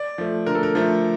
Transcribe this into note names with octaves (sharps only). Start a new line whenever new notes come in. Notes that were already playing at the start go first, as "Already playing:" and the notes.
Already playing: D5
F3 A3
D3 A#4
A4
A#4
F3 A3